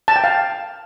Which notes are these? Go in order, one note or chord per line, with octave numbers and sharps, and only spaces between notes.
A5
G5
F5